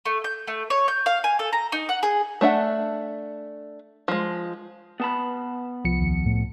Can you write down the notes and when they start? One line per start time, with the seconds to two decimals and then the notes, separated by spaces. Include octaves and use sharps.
0.06 A3
0.24 G6
0.47 A3
0.70 C#5
0.88 G6
1.06 F5
1.24 G#5
1.39 A4
1.53 A#5
1.72 D#4
1.89 F#5
2.03 G#4
2.41 A3 D4 E5 F#5
4.08 F3 G#3
5.00 B3 A5 B5
5.85 C2 F3 C#7
5.99 D#2
6.25 A2